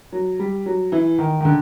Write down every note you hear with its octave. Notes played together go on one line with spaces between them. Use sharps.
F#3
G3
F#3
E3
D#3
D#3
D3